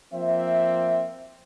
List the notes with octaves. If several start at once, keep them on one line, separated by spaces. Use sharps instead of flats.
F3 A#3 C4 C5 E5